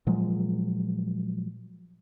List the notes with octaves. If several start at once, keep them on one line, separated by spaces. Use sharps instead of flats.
A#2 F3 F#3 G#3